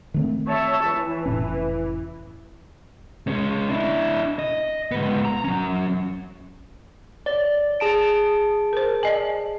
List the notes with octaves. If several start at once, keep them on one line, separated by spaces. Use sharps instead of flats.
D#3 A3 C4
C#5 E5 A5
E3
F1 A2 C#4
G#3 C#4
D4 E4
D#5
G#2 B3
A#5
F#3 C#4
C#5 D5
G#4 A5 D7
A#4 C5
D5 D#5 G#5